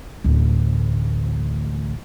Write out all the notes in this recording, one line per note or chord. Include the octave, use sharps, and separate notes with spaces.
A1 D2